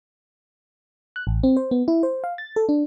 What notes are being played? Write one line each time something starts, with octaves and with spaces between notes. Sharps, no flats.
F#6
A1
C4
C5
B3
E4
C5
F5
A6
A4
D4